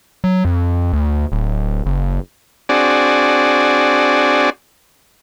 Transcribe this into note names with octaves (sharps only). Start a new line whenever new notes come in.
F#3
F2
D2
D1
F#1
C4 D4 F#4 G#4 D5